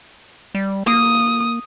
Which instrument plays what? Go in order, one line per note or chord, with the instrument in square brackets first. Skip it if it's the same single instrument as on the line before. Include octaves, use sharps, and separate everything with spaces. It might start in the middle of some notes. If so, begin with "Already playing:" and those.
[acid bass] G3
[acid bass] A#3 [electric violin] D#6